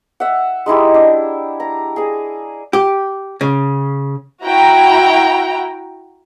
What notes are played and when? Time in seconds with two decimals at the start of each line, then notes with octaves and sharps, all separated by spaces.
0.20 E5 F#5
0.66 G#3 D#4 E4 G4
0.94 D4
1.60 A#5
1.96 G#4 G#5
2.73 G4
3.41 C#3
4.45 E4 F#4 G5 A#5